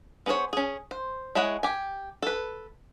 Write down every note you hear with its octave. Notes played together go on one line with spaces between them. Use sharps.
B3 G#4 A#4 C5 C#5
C#4 G#4
C5
G#3 E4 G#4 C#5 F#5
G4 G#5
A4 B4